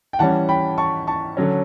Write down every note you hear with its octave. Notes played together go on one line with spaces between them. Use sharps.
G5
E3 G3 C#4 F#5 A5
G5 B5
A5 C#6
A5 C#6
D3 F#3 C#4